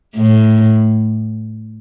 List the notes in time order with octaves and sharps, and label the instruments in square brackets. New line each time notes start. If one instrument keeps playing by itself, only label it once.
[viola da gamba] A2